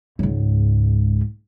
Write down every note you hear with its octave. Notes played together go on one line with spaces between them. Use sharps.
C#2 G#2